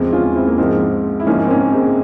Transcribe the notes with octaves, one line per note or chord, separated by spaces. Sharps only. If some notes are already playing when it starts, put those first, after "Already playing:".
Already playing: E2 C#3 F3 G#3 C4
C#4 F4
C4 E4
A#3
G#2 F3 G#3 C4
E4
G#2 F3 A#3 C#4
C4
A#3 C#4
G#3 C4